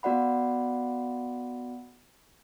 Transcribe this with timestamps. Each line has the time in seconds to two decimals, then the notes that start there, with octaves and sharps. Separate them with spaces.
0.03 B3 F#4 D5 F#5 B5